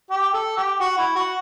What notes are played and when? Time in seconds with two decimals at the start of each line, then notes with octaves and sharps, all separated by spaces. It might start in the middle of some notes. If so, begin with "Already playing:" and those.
0.11 G4
0.34 A4
0.57 G4
0.80 F#4
0.98 E4
1.15 F#4